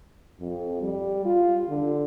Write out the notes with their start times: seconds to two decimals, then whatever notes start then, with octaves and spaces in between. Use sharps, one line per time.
0.40 F2
0.81 G3
1.25 F4
1.69 D3